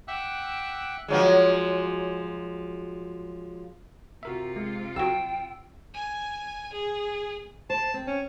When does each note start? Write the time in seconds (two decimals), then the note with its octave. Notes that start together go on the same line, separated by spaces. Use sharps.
0.08 E5 F#5 G5 D6 E6 F#6
1.08 F3 F#3 G#3
4.23 C3 F4 F#4 A#4 E5
4.56 G#3
4.96 C2 F#3 G5 E6
5.94 G#5
6.73 G#4
7.70 C5 A5
7.94 C4
8.07 C#4